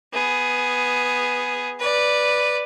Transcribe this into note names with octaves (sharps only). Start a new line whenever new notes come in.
B3 G#4
B4 D5